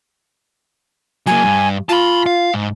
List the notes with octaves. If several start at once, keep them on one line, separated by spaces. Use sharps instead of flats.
F#3 A#3 G#5
G2
F4 A5 B5
F5
G#2